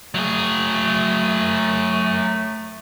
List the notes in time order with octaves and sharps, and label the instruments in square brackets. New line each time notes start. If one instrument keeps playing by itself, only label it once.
[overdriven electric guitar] F#3 G#4 [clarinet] A3